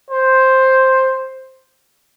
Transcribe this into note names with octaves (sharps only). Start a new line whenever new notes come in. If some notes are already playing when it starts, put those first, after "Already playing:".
C5